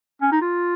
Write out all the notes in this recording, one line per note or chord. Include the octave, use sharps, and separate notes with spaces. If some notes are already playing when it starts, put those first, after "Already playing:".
C#4
D#4
F4